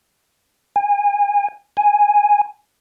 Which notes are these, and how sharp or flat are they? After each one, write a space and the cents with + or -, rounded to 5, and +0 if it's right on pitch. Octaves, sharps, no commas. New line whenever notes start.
G#5 -30
G#5 -5